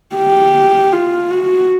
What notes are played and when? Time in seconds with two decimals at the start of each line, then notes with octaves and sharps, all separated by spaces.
0.16 G4
0.93 F4
1.31 F#4